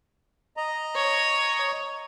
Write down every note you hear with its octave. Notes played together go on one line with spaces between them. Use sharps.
D#5 A#5
C#5